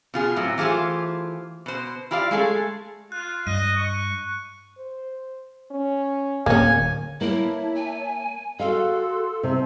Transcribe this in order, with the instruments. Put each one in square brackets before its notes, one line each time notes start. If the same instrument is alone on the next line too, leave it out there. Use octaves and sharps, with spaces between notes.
[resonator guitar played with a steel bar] B2 F4 G#4
A2 F#3 C4
E3 A3 F4 G4 G#4 C5
B2 C5
E4 F4 G4 D5 E5 F5
G#3 A3 G#4 A4
[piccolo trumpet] F4 [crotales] F#6
[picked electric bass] G2 [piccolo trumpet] D#5 [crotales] F#6 D#7
[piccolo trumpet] C#6
[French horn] C5
C#4
[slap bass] D1 [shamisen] A#3 C#4 [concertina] G#5
[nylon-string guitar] A#3 [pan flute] E4 [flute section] C#5 E5 A5
[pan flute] G#5
[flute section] F#4 G#4 C6 [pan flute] A4 [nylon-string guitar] F5
[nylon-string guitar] C3 [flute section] C5 A5